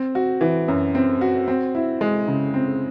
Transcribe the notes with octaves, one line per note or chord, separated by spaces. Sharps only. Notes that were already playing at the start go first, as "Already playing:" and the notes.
Already playing: C4
F#4
E3
F#2
C4
F#4
C4
E4
G#3
C#3
C4